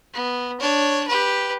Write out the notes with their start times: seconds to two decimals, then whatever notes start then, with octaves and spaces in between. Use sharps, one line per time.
0.14 B3
0.60 D4 C#5
1.08 G4 B4